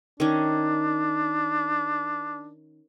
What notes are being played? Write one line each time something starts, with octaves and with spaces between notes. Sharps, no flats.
D#3 C#4 D4